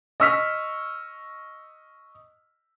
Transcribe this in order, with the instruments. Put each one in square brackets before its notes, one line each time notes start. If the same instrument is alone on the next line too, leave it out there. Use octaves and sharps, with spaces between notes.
[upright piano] D#5 C#6 E6 F6 B6